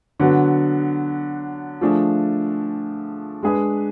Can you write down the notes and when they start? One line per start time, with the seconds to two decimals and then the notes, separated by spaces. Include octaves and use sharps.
0.20 D3 F#3 B3 F#4
1.81 F3 A3 D4 G#4
3.43 G#3 D4 G#4 B4